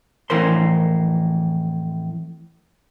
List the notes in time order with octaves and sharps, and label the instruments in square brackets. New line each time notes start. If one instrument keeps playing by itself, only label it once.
[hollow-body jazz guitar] F2 A2 E3 A#4 C5 C6